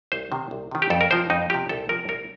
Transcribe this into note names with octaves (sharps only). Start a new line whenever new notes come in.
C2 C5
C3 D#3
C2
C3 D#3
G4
F2 A4
A#4
C3 F3 C5
F2 D#4
C3 F3 G4
C2 A4
C3 F3 A#4
C2 A#4